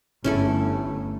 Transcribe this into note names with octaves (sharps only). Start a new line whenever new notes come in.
G1 A3 C#4 E4 A4